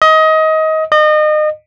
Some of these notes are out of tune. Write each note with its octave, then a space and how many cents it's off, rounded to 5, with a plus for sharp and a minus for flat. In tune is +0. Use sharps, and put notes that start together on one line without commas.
D#5 +25
D#5 -30